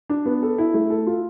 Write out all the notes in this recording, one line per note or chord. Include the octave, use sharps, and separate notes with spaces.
D4
B3
A4
E4
A3
A4
F4